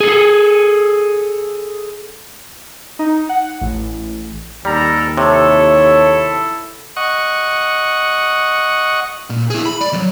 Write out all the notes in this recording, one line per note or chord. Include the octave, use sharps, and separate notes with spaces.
G#4 A4
D#4
F#5
A1
D#2 G3 A4 A#4 A#5
C3 E4 A4 C#5
D#5 F#5 C#6
A#2
E4 G#4
B5
D5
E2 F#3